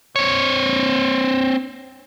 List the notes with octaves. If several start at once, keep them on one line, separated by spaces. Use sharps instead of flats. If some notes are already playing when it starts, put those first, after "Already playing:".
C4 C#5